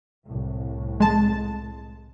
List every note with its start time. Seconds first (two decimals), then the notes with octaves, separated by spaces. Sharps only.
0.24 C2 A2
1.00 G#3 A5